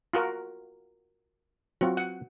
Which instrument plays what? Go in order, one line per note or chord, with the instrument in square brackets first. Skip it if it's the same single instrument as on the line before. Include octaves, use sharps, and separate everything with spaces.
[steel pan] F4 F#4 A#4
[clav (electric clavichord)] F#3 C4 F4 [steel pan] F#4
[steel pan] F#5